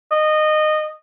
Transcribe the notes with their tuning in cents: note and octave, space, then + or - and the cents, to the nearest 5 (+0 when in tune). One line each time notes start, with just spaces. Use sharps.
D#5 -20